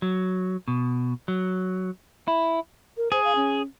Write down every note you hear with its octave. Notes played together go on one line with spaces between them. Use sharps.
F#3
B2
F#3
E4
A#4
G#4 C5
F5
C#4